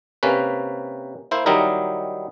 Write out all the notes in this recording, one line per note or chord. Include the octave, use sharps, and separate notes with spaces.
C3 A#3 C#4 B4
A#3 E4 C5
D#3 F#3 G3 D#4 E4 A#4